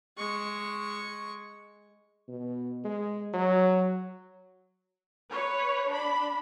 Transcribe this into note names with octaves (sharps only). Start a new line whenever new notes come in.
G#3 C#6
B2
G#3
F#3
B4 C#5
D4 B5